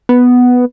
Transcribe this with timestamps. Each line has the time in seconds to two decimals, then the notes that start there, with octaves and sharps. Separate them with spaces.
0.09 B3